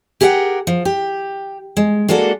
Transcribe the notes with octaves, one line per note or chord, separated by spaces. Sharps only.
G4 G#4 A#4 D#5 F#5 G5
F3
G4
G#3
G#3 A#3 D4 F#4 A4